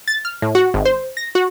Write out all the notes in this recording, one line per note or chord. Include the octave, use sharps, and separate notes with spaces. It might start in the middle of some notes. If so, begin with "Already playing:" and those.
A6
F6
A2
F#4
G#1
C5
A#6
F#4